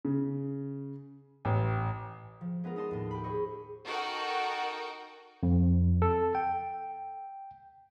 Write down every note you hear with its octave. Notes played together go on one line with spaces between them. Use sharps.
C#3
A1
F3
G#3 B3 F4 A#4
D#4 D#5 A5 C6
D#2 A2
G4 B5
G#4 C5 D#5 C#6 E6
D#4 F#4 A4 A#4 F#5 G5
F2
A4
G5